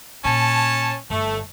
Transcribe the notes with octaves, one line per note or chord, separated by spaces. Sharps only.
A#2 C#4 C#5 A5
G1 A3